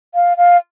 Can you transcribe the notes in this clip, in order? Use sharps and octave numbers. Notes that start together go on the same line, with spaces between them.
F5
F5